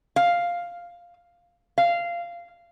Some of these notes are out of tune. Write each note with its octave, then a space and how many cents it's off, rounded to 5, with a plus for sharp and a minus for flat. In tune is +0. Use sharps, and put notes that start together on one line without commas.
F5 +0
F5 -15